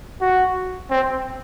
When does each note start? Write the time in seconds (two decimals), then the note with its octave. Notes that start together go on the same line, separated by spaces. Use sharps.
0.21 F#4
0.90 C4